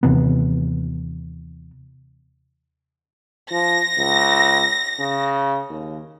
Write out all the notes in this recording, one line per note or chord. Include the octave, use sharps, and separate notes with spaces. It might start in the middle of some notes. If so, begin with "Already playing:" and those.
D#2 C3 E3 B3
F3 A#6
C#2
C#3
D#2